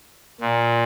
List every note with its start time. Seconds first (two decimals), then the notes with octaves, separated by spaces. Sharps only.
0.41 A#2